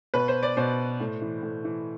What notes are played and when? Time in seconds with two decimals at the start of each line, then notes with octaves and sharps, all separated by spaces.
0.14 B2 B4
0.28 C5
0.43 D5
0.57 B2 C5
1.00 A2
1.22 E3
1.43 A2
1.65 E3